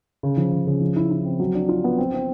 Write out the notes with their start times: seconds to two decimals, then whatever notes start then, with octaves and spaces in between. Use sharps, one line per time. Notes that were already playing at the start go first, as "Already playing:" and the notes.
0.23 C#3
0.37 F3
0.52 C#3
0.67 C#3
0.81 F3
0.96 E4
1.10 E4
1.25 C4
1.40 F#3
1.55 D4
1.69 F4
1.84 B3
1.98 C4
2.14 C4